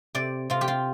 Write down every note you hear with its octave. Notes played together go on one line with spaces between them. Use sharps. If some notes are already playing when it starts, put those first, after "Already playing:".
C3 D5
C3 F4
G4
F4